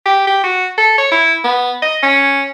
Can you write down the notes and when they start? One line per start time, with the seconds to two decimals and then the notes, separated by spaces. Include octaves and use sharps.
0.06 G4
0.27 G4
0.44 F#4
0.78 A4
0.98 C#5
1.12 E4
1.44 B3
1.82 D#5
2.03 C#4